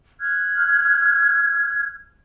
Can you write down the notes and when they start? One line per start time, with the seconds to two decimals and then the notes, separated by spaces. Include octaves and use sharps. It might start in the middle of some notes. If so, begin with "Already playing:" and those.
0.20 F6 F#6 G#6